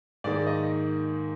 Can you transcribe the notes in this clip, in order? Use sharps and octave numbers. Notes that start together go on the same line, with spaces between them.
G#2 D#3 A#3 D5
D#5